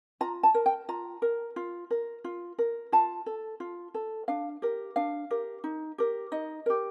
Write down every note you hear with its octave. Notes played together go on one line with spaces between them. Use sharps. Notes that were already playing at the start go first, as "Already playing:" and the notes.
F4 A#5
A5
A#4
G5
F4 A#5
A#4
F4
A#4
F4
A#4
F4 A5
A4
F4
A4
D4 F5
G4 A#4
D4 F5
G4 A#4
D#4
G4 A#4
D#4 D#5
G4 A#4